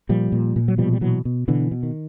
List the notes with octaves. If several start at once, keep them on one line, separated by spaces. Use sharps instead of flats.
A#2 F3 G3
A#2
A#2
F#3
B2 F3 G3
G3
B2 E3 F#3
B2
B2 D3 E3
B2
D#3